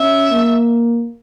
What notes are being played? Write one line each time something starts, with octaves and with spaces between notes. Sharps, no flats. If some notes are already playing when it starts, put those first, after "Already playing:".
Already playing: C#4 E5
A#3